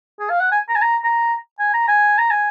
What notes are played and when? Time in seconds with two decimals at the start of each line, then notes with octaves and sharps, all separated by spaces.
0.20 G#4
0.30 F5
0.40 F#5
0.52 G#5
0.69 A#5
0.76 G#5
0.82 A#5
1.04 A#5
1.59 G#5
1.74 A#5
1.88 G#5
2.18 A#5
2.30 G#5